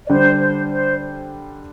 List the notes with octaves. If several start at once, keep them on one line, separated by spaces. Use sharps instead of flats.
D5
D3 G3 D4 C5
C5
C5